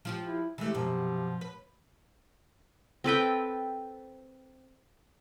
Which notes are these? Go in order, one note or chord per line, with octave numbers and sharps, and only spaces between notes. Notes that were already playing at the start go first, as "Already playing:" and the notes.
F3 F4 G4
E4
C3 E3 G#3 A3
F#2 B2 F3
B4
C4 A4 B4 G5